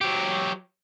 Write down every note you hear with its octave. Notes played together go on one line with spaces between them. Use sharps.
F#3 G4